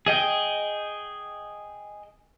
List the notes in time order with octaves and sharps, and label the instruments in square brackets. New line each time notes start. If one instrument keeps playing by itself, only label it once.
[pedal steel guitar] G#4 D#5 G5